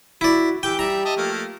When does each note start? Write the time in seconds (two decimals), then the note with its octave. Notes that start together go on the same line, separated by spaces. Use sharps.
0.21 E4 F#4 D5
0.63 E3 G4 G5 D6
0.79 G3 E5 A#5
1.05 D#5 E5 A5
1.17 F3 A3 A#3